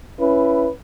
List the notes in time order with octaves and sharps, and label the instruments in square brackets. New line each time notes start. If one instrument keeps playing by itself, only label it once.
[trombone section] C#4 E4 B4